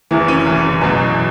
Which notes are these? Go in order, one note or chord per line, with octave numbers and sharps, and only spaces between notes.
F#1 E2 E3 E4
C#4
F#1 E2 E3
E2 B2 F#3